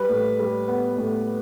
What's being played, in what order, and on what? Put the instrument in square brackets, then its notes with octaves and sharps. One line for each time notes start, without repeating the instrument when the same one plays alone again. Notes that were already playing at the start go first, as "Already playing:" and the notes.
Already playing: [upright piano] G3 [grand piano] B4
[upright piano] A2
G3
B3
A2